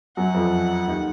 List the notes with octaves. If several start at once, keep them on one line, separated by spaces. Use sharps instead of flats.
F#2 F#3 F#5
F2 F3
D#2 D#3